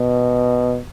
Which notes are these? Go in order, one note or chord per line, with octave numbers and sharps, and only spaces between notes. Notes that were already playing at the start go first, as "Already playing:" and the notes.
Already playing: B2